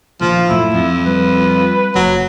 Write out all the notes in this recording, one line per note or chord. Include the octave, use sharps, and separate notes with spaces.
A#1 D#3 F3 F4
F#2 A2 E4
F2 F3
G3 B4
F#1 F#3